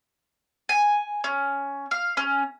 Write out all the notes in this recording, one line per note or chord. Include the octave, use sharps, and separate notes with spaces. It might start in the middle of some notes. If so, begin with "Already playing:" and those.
G#5
C#4
F5
C#4